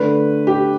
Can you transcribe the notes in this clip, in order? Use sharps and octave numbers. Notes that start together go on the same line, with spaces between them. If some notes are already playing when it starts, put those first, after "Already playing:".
Already playing: D3 A3 B4
G4